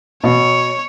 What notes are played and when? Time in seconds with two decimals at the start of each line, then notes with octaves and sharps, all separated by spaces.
0.24 B2 C#5